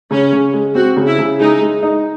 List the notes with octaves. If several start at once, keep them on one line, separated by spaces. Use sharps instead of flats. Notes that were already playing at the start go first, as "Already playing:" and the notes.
C#3 C#4
C#3
G#3
C4 F#4
C#3
E4
C#3
G#3 D#4
G#3
D#4